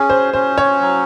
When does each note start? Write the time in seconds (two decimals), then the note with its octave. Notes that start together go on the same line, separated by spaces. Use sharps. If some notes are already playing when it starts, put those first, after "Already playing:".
Already playing: C#4 G#4
0.10 C5
0.33 C#4 C5
0.58 C#5
0.81 F#3